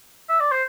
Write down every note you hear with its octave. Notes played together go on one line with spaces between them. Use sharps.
E5
D5
C5